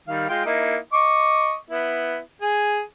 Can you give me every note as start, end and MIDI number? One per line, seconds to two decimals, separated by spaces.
0.08 0.28 51
0.08 0.28 55
0.08 0.28 77
0.29 0.41 56
0.29 0.41 65
0.29 0.41 79
0.46 0.77 58
0.46 0.77 63
0.46 0.77 64
0.93 1.55 75
0.93 1.55 85
0.93 1.55 86
1.70 2.19 59
1.70 2.19 64
2.42 2.81 68
2.42 2.81 80